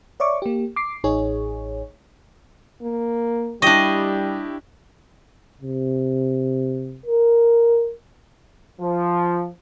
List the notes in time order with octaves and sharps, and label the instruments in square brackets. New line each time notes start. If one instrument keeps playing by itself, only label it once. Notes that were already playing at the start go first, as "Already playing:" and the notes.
[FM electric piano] C#5 D5 E5 C#6 D6
A#3 G4
D6 C7
A1 D#4 G#4 C#5
[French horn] A#3
[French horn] G3 [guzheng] D4 D#5 [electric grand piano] E4 G4 C#6
[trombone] C3
A#4
[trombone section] F3